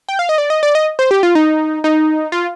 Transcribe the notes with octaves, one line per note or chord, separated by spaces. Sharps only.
G5
F5
D#5
D5
D#5
D5
D#5
C5
G4
F4
D#4
D#4
F4